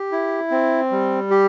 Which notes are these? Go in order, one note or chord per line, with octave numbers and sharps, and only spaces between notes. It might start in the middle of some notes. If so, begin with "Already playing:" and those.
Already playing: G4
E4
C4
G3
G4